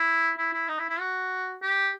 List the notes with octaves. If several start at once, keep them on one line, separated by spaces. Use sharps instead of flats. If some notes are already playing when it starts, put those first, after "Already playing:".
Already playing: E4
E4
E4
D#4
E4
E4
F#4
G4